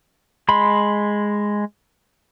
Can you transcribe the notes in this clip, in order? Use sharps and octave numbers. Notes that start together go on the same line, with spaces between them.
G#3 B5 C6